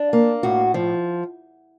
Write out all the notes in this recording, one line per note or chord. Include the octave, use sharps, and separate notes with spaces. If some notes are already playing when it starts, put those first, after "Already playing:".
Already playing: D4
A#3
A2 F#4
F3